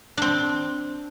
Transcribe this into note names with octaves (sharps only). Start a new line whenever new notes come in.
C4 D4